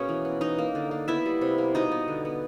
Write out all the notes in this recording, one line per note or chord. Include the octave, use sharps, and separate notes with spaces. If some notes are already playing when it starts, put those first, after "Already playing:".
Already playing: B2 A#3 C#4 G#4 C#5
E3
B3
E3 D#4 D#5
A#3
D3
A#3
B3 E4 E5
G3
C3
A#3
B2 D#4 D#5
B3
D3
B3